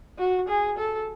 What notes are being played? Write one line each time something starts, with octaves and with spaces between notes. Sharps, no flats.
F#4
G#4
A4